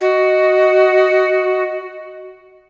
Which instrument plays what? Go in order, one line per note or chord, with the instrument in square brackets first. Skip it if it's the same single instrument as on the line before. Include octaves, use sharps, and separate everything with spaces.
[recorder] F#4 [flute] D#5